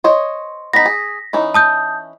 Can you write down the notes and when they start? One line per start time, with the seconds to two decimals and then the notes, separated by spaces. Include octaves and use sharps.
0.04 C5 C#5 D#5
0.73 B3 D#4 A#6 B6
0.86 G#4
1.33 E3 C#4 D#4
1.54 A5 D#6 G6